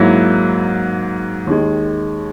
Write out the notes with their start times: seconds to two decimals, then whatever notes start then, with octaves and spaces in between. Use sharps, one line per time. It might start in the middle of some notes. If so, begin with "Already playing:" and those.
Already playing: G#2 F#3 A#3 E4
1.47 D#2 D#3 G#3